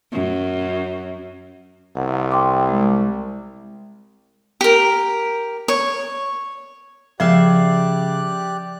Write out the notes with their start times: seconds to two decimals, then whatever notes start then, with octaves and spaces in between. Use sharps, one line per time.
0.12 F#2
1.97 C2 F#5
2.32 G5 C6 D6
2.69 G#3
4.61 G4 A#4
5.68 C#5
7.20 C#3 F3 G4 D5 E5 F5 F#6